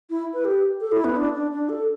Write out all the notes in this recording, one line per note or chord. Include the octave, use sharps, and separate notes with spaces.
E4
B4
G4
A4
E4
B3
D4
D4
D4
A4